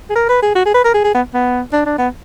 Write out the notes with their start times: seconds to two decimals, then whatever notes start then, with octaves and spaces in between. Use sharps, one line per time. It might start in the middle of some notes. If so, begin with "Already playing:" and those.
0.10 G#4
0.15 A#4
0.29 B4
0.42 G#4
0.55 F#4
0.65 G#4
0.74 B4
0.84 A#4
0.94 G#4
1.04 G#4
1.14 B3
1.34 B3
1.73 D4
1.86 D4
1.99 B3